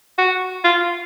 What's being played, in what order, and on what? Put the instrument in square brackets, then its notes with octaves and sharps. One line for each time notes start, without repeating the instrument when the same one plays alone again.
[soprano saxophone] F#4
F4